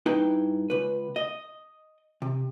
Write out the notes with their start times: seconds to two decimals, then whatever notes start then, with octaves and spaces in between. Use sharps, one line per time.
0.06 G2 D#4 E4 B4 G5
0.70 C#2 B4
1.16 D#5
2.22 C3